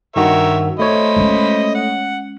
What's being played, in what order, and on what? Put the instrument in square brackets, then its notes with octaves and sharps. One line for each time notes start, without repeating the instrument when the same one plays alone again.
[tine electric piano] G2 D#3 F#4 [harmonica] A#4 C#5 E5
[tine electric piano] A3 C#5 [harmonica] C5 D#5 B5
[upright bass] G#3 C#4
[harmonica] F#5